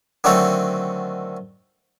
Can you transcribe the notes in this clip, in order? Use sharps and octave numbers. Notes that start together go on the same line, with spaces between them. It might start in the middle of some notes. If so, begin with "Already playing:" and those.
D3 D#3 F#3 A3 C4 A4